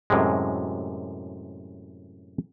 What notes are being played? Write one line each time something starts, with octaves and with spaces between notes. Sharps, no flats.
F#2 A2 C3 G#3